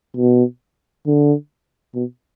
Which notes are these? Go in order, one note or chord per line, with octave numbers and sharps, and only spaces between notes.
B2
D3
B2